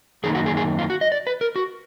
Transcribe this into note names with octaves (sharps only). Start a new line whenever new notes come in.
F#2 D#3 A#3 D#4 G#4
F#4
G#4
G#4
F4
F#4
D#5
D5
B4
A#4
F#4